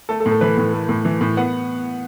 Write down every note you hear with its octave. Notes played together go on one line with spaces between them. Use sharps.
A3 A4
A4
A2
A4
E3 B4
A2
A3
A2
E3
A2
B3 F#5